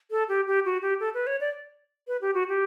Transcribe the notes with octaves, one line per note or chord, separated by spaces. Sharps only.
A4
G4
G4
F#4
G4
A4
B4
C#5
D5
B4
G4
F#4
G4